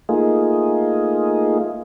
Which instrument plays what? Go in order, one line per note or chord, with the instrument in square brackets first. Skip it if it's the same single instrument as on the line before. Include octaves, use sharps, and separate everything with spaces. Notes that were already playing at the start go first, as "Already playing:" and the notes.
[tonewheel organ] A3 A#3 D#4 F4 G#4